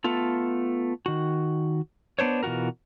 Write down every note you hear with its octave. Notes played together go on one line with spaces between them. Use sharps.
A3 B3 F4 A4
D#3 F#4
B3 D4 C5 C#5
B2 E3 F4 F#4 A#4